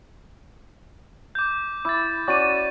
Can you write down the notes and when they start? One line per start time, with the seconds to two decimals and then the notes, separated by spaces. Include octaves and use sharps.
1.35 D6 G6
1.85 E4 D6 A6
2.28 C#4 F#4 D5 D6 D#7